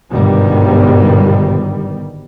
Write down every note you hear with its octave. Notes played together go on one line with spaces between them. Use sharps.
G1 G#2 B2 D#3 G3